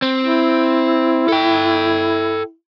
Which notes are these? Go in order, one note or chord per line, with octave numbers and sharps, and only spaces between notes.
C4
E4
A4 G5